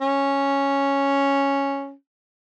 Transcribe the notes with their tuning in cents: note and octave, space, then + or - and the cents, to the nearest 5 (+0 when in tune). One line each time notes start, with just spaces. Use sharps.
C#4 +0